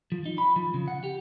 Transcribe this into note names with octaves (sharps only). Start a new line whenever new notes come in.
F3
D#4
B5
F3
C#3
F#5
G4